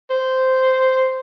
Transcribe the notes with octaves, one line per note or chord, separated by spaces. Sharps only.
C5